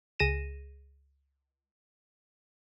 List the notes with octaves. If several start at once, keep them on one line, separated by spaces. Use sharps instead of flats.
C#2 G#4 A#6 D#7 E7